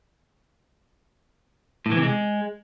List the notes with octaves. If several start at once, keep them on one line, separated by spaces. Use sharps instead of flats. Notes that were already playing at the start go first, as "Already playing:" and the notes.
A2
E3
C3
G#3